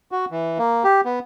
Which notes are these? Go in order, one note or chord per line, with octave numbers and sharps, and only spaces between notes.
F#4
E3
A#3
G4
B3